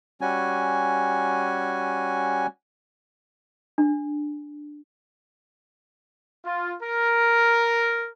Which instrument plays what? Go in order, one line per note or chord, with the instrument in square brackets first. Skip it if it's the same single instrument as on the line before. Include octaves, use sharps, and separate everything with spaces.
[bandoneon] G3 C#4 F#4 G#5
[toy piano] D4
[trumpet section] F4
A#4